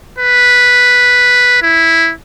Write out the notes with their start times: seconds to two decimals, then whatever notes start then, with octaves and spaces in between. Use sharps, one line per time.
0.18 B4
1.62 E4